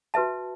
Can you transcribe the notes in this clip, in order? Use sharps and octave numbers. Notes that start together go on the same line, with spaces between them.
F#4 B4 E5 A5